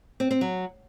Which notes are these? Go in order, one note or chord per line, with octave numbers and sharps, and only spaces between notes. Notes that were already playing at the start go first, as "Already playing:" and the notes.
C4
C4
F#3